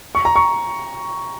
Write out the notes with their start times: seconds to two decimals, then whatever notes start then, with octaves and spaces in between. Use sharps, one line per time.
0.15 C#6
0.25 A#5
0.36 C#6